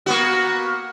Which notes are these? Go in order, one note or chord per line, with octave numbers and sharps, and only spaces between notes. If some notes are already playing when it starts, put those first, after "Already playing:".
A#3 B3 F#4